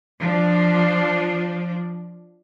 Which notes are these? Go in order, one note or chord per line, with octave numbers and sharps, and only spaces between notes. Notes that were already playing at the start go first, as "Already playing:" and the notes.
F3 D4